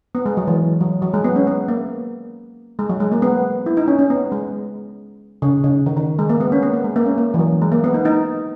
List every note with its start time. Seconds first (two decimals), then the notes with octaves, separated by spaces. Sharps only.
0.15 B3
0.26 G#3
0.37 F#3
0.47 E3
0.81 F#3
1.02 F#3
1.14 G#3
1.24 B3
1.36 C#4
1.47 B3
1.68 A#3
2.79 G#3
2.89 F#3
3.00 G#3
3.12 A#3
3.22 B3
3.66 E4
3.77 D#4
3.88 C#4
3.99 C#4
4.10 B3
4.32 G#3
5.42 C#3
5.64 C#3
5.86 D#3
5.97 D#3
6.19 G#3
6.29 A#3
6.40 B3
6.52 C#4
6.62 B3
6.73 A#3
6.84 G#3
6.96 A#3
7.06 C#4
7.18 A#3
7.34 E3
7.39 F#3
7.61 G#3
7.72 A#3
7.84 B3
7.94 D#4
8.05 D#4